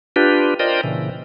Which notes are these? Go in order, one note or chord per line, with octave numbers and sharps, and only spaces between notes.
D4 F4 G4 B4
F4 A#4 C5 D5 D#5 G5
A#2 C#3 E3